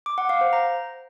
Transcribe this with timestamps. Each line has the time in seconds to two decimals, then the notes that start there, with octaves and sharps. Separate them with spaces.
0.06 D6
0.18 F#5
0.29 F5
0.41 C5
0.53 A#5